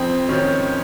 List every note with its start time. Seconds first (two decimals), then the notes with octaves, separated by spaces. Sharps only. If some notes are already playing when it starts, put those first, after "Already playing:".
Already playing: F2 C4
0.29 D#3 C#4